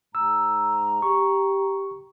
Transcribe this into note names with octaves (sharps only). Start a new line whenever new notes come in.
G#2 A#5 E6
G4 C#6